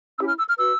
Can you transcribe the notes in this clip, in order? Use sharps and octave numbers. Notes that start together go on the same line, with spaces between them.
C#4 E4 G4 E6
F6
E6
F6
F#4 B4 E6